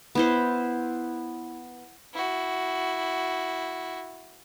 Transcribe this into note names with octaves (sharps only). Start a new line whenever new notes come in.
B3 E4 C5
E4 F#4